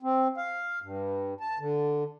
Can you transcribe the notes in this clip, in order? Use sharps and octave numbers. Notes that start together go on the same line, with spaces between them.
C4
F5
G2
A5
D3